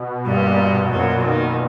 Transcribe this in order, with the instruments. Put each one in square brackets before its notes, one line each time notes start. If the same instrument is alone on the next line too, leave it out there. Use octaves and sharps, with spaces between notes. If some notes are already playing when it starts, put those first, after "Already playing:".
Already playing: [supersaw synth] B2
[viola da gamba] G2 G3 [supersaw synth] A#2
[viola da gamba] F#2 F#3
D#3